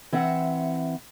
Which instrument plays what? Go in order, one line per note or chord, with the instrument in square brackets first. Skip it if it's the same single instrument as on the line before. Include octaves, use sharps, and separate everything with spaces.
[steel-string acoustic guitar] E3 C4 E5 F#5